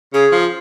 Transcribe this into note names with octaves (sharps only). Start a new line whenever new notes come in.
C#3 G#4
F3